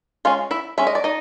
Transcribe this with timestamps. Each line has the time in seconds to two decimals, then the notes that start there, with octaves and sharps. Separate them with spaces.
0.25 G#3 C#4 F4 F5
0.51 E4 E5
0.78 G#3 C#4 E5
0.87 D#5
0.95 D5
1.04 D#4 D#5